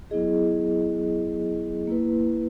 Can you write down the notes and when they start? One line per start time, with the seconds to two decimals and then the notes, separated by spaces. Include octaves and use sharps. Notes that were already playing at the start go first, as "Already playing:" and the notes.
0.11 F#3 B3 E4 G#4 D#5
1.87 A#3 E4 B4